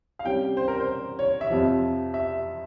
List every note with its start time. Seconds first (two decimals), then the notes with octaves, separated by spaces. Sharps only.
0.19 F5
0.25 C3 G3 C#4 G5
0.57 C5
0.68 A#4
0.80 C5
1.19 C#5
1.41 E5
1.50 F2 C3 F3
2.14 E5